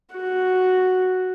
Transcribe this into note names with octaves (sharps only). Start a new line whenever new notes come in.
F#4